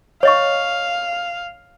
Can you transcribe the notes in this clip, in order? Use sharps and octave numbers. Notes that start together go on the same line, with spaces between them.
C#5 D#5 F5 C#6